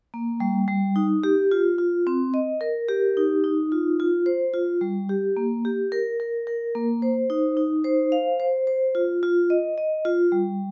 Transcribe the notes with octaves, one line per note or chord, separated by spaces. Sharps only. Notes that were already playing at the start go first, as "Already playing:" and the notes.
A#3
G3
G3
D#4
G4
F4
F4
C4
D#5
A#4
G4
D#4
D#4
F4
F4
C5
F4
G3
G4
A#3
G4
A#4
A#4
A#4
A#3
C5
D#4
D#4
C5
F5
C5
C5
F4
F4
D#5
D#5
F4
G3